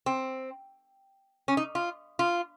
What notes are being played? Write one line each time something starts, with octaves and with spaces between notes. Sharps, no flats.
C4
C#4
D#4
F4
F4